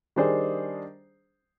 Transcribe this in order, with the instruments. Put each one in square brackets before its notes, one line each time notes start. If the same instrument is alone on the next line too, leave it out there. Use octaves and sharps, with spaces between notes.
[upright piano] D#3 G3 D4 G#4 C5